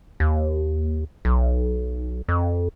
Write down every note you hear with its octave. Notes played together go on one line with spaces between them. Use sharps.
D#2
B1
F2